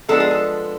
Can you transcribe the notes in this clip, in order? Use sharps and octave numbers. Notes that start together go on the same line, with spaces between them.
F3 G#3 B3 D4 A4
G#4
A4